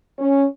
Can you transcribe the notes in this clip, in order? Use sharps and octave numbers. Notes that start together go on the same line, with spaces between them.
C#4